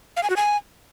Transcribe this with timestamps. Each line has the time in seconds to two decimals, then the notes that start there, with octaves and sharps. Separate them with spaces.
0.17 F5
0.23 G#5
0.30 F#4
0.36 G#5